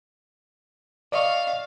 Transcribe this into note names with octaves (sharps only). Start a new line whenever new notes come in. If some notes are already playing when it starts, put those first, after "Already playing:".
D5 D#5 F5 C#6